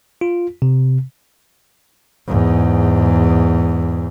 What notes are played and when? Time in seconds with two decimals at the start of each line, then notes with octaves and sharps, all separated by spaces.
0.21 F4
0.62 C3
2.28 E2 G#2